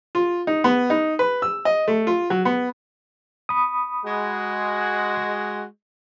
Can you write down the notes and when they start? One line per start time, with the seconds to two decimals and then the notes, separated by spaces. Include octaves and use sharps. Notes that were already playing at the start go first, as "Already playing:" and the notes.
0.15 F4
0.47 D#4
0.64 B3
0.90 D#4
1.19 B4
1.42 E6
1.65 D#5
1.88 A3
2.07 F4
2.30 F#3
2.45 B3
3.49 B5 D#6
4.05 G#3 F#4